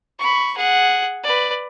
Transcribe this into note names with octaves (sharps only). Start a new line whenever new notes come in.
B5 C#6
G#4 F#5
B4 D5